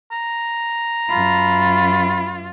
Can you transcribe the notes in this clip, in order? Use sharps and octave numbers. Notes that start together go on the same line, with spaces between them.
A#5
F#2 F4 B5